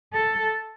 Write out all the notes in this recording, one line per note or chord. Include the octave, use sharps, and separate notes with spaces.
A4